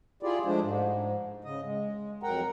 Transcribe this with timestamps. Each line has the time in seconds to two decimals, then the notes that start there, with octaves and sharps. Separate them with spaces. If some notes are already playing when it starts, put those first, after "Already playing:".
0.23 E4 F4 G4 G#4 D5
0.45 F3 G#3 A3 D4 C5
0.61 G#2
1.44 C#3 D#5
1.63 G#3
2.23 F2 F#3 A#4 F#5 G5 A#5